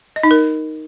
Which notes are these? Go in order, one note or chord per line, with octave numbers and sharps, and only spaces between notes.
D#5
D#4
A#4